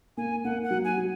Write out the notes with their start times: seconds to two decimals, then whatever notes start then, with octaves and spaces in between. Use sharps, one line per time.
0.17 A#3 G#5
0.45 A#3 F#5
0.64 F#5
0.71 F#3
0.84 G#5
0.97 F#3